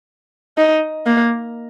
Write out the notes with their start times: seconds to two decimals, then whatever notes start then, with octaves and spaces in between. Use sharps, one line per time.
0.58 D#4
1.07 A#3